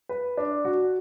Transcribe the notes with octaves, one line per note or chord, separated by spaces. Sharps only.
B4
D4
F#4